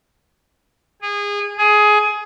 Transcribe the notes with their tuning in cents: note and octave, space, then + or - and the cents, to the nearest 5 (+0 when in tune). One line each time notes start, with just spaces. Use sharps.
G#4 -25
G#4 +15